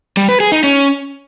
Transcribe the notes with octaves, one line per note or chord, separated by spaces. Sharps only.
G3
B4
G#4
D#4
C#4